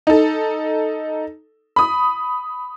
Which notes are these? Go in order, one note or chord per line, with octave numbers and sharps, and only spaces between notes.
D#4 A4
B5 D#6